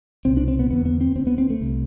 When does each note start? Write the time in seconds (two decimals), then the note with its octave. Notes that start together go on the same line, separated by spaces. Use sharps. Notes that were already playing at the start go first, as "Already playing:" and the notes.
0.25 C2 B2 C4
0.37 D4
0.48 C4
0.59 B3
0.71 E2 D3 B3
0.85 B3
1.01 C4
1.15 D2 D3 C4
1.27 B3
1.38 C4
1.50 A3
1.61 C2 C3